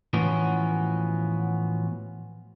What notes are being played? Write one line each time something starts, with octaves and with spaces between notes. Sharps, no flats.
A2 E3 F3 B3 C#4 F#4